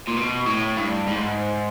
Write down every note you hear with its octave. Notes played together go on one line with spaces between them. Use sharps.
A#2
B2
A2
G2
G#2